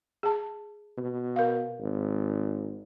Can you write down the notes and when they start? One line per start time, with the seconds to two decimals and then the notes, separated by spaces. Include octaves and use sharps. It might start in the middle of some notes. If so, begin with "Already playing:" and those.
0.23 G#4 A5
0.98 B2
1.36 A#4 F5
1.79 G#1